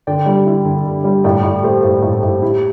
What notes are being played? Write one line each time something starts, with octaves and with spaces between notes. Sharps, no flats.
D3 D5 G5
G3
E4
D3
D3
G3
A2 D5 G5
A2 A4 D5
A3 G4 C5
A2
A2 A4
A2 G4
E4 G4